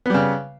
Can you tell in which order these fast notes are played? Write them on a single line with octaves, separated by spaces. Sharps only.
B3 G3 C#3